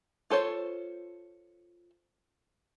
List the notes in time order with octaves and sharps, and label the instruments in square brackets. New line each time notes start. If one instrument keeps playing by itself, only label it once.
[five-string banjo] F4 A4 C5 C#5